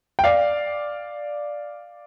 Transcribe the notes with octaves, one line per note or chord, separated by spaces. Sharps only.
G5
D5 F5